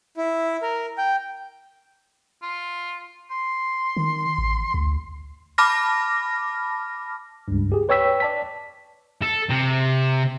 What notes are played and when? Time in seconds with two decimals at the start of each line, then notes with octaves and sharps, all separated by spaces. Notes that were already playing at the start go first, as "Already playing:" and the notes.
0.17 E4
0.62 A#4
0.98 G5
2.42 F4
3.30 C6
3.97 D#3
4.38 A1
4.74 D2
5.58 A5 B5 D6 F6 A#6
7.48 C#2 G2
7.72 G4 G#4
7.89 B4 C#5 G5 E6 B6
8.20 D5 A5 B6
9.23 A4
9.50 C3